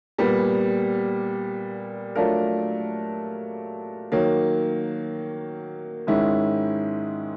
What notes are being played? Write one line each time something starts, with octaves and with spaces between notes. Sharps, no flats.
A#2 G3 B3
F#3 A3 D4 F4 A#4
D#3 F#3 A#3
G#2 D#3 G#3 C#4 E4